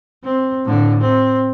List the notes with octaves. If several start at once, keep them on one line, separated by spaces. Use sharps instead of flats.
C4
A2 D3
C4